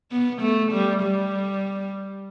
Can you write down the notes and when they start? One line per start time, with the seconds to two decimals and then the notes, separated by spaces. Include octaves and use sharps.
0.11 B3
0.41 A3
0.72 G3
1.02 G3